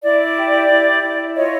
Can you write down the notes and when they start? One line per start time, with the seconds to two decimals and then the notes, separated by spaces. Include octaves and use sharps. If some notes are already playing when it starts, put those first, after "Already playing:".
0.03 E4 D5
0.36 G4
0.70 E4
1.03 E4
1.36 F4 C#5 D#5